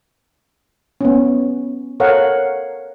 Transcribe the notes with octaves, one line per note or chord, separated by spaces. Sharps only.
B3 C#4
A4 A#4 C#5 F5 F#5